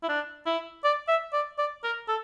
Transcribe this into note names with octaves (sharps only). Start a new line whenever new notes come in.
E4
D4
E4
D5
E5
D5
D5
A#4
A4